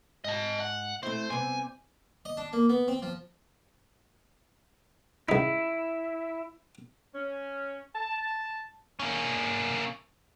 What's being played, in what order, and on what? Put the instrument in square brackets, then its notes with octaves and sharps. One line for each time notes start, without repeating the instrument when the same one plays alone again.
[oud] G#2 [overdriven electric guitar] D#5 A5
[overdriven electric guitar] F#5
[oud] A3 C4 E4 [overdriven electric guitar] C5
[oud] C3 G3 B3 [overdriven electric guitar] G#5
[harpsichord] D#5
D4
A#3
B3
C4
F3
[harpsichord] C#2 D#4 [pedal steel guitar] E4
[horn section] C#4
A5
[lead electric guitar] A#3 C#4